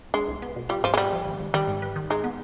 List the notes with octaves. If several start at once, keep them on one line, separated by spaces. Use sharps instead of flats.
G#3 D4
C2
B3
B2
G3 F4
G#2 F3
G#3
G3 B3
F3
G#1
G#1
D#3 G3
G#2
B4
D#3
G#3 D#4
B3